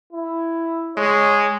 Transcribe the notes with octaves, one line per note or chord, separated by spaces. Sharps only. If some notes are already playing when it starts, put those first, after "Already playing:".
E4
G#3 C#5